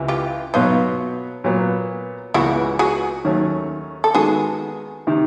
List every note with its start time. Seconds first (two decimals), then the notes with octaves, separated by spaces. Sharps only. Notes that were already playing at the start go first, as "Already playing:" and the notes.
Already playing: C#2 C3 E3
0.08 F4 G4
0.54 B2 F#3 B3 D#4 F4
1.44 A#2 F#3 B3
2.34 C#2 C#3 E3 G#3 B3 E4 F#4
2.79 F#4 G#4
3.25 D#2 D#3 F#3 A3 C#4
4.04 A4
4.15 D#3 G#3 B3 F#4 G#4
5.07 C3 D#3